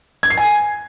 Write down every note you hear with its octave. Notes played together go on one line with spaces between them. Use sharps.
G#6
C7
G#5